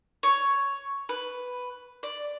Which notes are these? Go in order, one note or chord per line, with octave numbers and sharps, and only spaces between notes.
C#5
B4
D5